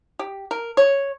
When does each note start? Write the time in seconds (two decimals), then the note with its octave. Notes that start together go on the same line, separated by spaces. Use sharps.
0.19 G4
0.51 A#4
0.77 C#5